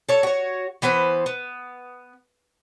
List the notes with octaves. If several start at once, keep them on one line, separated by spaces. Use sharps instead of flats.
A4 C#5
F#4 C#5
E3 B3 B4 C5
B3